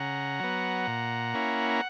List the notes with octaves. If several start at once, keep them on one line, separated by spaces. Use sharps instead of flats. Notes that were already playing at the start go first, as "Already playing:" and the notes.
Already playing: C#3 F#5 A#5
F#3 B3
A#2
A#3 C#4 E4
A#5